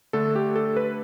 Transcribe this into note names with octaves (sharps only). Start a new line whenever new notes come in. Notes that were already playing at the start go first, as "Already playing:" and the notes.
D3 A3 D4 A4
G4
A4
B4